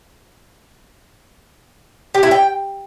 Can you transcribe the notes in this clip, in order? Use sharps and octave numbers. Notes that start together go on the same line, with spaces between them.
G4
E4
G5